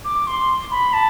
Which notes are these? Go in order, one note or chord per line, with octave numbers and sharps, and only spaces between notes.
D6
C6
B5
A5